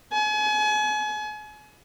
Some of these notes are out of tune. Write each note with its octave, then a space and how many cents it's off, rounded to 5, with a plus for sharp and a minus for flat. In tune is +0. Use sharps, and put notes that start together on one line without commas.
G#5 +35